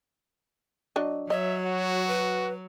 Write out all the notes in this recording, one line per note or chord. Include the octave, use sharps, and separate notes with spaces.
F#3 D4 D#5
F#3 C#5 D#5 E5
F#4
B4